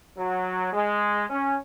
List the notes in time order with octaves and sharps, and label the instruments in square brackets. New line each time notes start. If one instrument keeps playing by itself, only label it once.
[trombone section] F#3
G#3
C#4